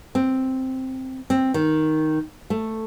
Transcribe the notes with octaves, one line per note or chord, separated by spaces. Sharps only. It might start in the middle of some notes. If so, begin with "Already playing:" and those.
C4
C4
D#3
A3